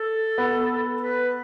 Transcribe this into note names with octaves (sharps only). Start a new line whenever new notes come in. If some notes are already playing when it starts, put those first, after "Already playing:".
Already playing: A4
B3
B4